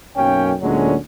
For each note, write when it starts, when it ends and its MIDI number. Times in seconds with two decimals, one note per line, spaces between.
0.16 0.53 35
0.16 0.53 42
0.16 0.53 58
0.16 0.53 61
0.16 0.53 79
0.62 0.95 38
0.62 0.95 46
0.62 0.95 50
0.62 0.95 54
0.62 0.95 56
0.62 0.95 61